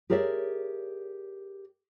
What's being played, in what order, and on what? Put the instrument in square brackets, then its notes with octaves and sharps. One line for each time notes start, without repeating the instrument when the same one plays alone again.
[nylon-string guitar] G4 G#4 A#4 C#5 D5 E5